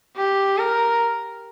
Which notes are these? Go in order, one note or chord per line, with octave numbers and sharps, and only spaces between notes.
G4
A#4